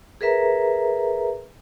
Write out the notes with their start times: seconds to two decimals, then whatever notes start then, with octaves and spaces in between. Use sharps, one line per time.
0.21 G#4 A#4 B4 E5 A#5